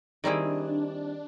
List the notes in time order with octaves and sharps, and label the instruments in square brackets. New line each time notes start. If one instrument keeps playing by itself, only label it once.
[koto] D#3 G3 C4 E4 G#4 [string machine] D4